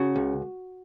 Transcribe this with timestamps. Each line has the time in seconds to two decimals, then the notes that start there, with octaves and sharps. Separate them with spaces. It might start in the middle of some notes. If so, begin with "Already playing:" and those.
Already playing: C#3 F#4
0.16 C#2